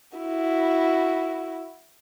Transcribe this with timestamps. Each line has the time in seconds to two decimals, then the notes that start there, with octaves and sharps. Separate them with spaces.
0.18 E4 F#4